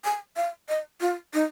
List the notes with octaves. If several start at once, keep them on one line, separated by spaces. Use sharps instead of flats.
G#5
F5
D#5
F4
D#4